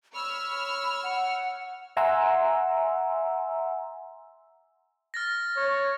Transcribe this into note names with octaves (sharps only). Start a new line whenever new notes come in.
C#5 B5 E6 F6
F#5
E5 F#5 G#5 A#5 C6 E6
F6 A6 A#6
C#5